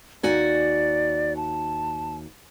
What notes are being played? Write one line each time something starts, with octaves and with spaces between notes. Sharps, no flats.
D#2 F#4 D5 G#5
A5